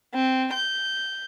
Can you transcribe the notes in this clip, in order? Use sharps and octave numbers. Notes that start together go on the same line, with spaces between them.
C4
G6